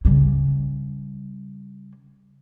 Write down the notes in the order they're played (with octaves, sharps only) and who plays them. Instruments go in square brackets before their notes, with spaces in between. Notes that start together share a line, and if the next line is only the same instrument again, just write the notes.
[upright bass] C#3 G3